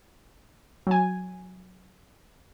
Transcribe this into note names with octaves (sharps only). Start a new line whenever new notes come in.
F#3 G#5